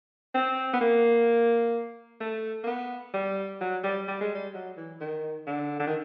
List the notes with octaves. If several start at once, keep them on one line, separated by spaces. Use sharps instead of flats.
C4
B3
A#3
A3
A#3
B3
G3
F#3
G3
G3
G#3
G3
F#3
E3
D#3
D3
D3
D#3